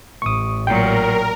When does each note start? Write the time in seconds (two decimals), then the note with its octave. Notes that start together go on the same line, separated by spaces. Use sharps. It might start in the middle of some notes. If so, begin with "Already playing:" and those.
0.22 A1 C#6 D#6
0.67 A#2 F#3 A#4 G5